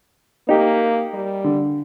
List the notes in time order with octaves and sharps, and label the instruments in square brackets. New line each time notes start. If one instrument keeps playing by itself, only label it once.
[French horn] A#3 [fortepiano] D#4 G4
[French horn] G3
[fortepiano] D3